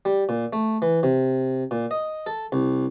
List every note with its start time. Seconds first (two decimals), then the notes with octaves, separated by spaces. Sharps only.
0.05 G3
0.29 A#2
0.53 A3
0.82 E3
1.03 C3
1.71 A#2
1.91 D#5
2.26 A4
2.52 C2